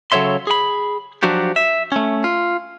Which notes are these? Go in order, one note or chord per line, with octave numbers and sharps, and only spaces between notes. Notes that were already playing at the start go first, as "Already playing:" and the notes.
C#3 F#3 A4 C#5 E5 C6
G#4 B5
F3 F#3 D4 F#4 G4
E5
A3 C#4
F4